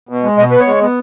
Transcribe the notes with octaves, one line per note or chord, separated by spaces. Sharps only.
B2
G#3
B2 D#5
B3 B4
C#5
G#3
B3